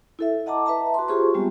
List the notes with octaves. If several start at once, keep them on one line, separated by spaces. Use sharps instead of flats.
E4 A4 E5
D#5 F#5 A5 A#5 D6
B4 E5 A5 A#5
F#4 C6
F4 G4 G#4 C5 C6 C#6
G3 G#3 B3 C4 F4 G4